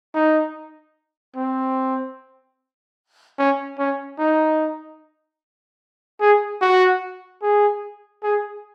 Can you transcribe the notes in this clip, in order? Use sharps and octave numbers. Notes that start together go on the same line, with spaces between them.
D#4
C4
C#4
C#4
D#4
G#4
F#4
G#4
G#4